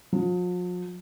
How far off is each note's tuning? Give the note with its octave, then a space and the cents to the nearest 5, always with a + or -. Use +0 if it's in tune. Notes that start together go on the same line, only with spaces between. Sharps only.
F3 +45